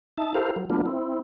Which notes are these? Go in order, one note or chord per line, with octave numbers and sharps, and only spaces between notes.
D#4 E5 A5
E4 G4 A4 A#4 C5 F5
F#3
F#3 A3 B3 D4 F4
C4 E4